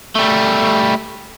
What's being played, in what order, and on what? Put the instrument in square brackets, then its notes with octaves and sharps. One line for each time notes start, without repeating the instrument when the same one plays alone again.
[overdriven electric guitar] G3 A3